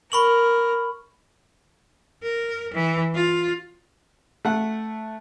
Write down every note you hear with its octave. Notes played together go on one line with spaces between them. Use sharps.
A#4 B5 C#6 F#7
A#4
E3
F4
A3 F#5